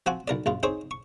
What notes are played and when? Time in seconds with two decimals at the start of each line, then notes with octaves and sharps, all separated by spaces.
0.06 F3 C4 F#4 F#5 G#5
0.28 B1 A#4 D5
0.46 A#1 F#2 F4
0.63 C4 D#4 G#4 C5 C#5
0.91 C#6